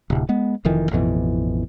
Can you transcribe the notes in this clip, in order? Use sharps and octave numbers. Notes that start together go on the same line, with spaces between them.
D1 C3
G#3 B3
F1 F2 D#3 E3
A1 F2 B2 E3